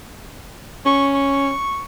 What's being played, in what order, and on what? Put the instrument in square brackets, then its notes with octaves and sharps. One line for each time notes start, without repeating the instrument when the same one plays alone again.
[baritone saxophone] C#4 [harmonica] C#6
[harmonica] C#6